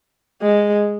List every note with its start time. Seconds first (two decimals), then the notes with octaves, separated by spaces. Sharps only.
0.42 G#3